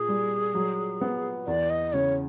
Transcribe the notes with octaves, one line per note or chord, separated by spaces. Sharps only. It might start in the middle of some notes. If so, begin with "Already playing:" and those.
Already playing: A#2 G#4
G3
F#3
B3
E2 D5
D#5
C#3 C#5